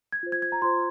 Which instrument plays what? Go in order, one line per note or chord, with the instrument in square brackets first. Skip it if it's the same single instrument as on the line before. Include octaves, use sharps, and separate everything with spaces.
[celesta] G#6
F4 C5
G#6
G#6
A#5
F4 C5 C6